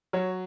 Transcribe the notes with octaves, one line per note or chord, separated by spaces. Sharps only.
F#3 C#5